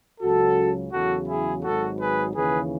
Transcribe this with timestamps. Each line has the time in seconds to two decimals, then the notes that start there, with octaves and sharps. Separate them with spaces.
0.21 C#2 C#3 F#3 F#4 A4
0.92 E2 C#3 F#3 F#4 A4
1.28 E4 G#4
1.63 G#1 G#2 F#3 F#4 A4
1.99 G#4 B4
2.35 D#2 C#3 E3 G#4 B4